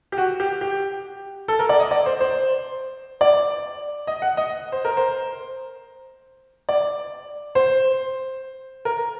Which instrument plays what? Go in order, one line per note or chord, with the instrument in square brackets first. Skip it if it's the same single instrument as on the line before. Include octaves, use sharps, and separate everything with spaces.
[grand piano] G4
F#4
G4
G4
A4
A#4
D5
D#5
D5
C5
C5
D5
D#5
F#5
D#5
C5
A#4
C5
D5
C5
A#4